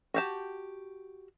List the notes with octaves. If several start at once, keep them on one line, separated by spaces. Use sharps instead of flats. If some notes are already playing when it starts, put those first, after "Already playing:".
F#4 G4 A5